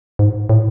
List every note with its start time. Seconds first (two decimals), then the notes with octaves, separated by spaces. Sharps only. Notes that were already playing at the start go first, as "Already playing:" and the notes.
0.19 G#2
0.49 A2